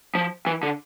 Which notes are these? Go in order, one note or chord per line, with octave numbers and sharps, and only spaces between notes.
F3
E3
D3